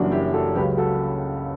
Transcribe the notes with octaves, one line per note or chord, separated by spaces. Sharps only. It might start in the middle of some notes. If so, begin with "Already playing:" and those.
Already playing: F#1 F#2 E3 G3 D4 F#4
E4 G4
F#4 A4
C#2 C#3 F#3 G4 B4
F#4 A4